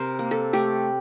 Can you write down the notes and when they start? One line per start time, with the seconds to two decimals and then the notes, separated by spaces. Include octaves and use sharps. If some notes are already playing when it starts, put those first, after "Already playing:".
Already playing: C3 A#4 C5
0.19 A#3
0.31 A4
0.53 A3 G4